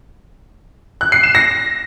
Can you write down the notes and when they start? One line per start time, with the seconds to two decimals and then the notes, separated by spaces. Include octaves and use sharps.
1.01 F#6
1.12 C7
1.23 E7
1.35 A#6